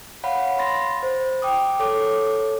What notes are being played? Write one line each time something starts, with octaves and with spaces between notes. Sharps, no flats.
C#5 F5 F#5 B5
B5 C6 A6 A#6
C5
G5 D6 D#6
A4 C#5 D6